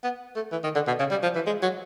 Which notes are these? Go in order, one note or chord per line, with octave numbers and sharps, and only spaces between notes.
B3
A3
E3
D#3
D3
B2
C#3
G3
F3
E3
G#3
F#3